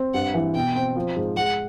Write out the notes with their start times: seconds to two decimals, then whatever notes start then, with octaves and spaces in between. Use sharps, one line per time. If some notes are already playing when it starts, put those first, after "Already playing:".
Already playing: C4
0.14 G2 F#5
0.34 E3
0.54 B2 G5
0.75 C4
0.96 F3
1.16 G#2
1.36 G#3 F#5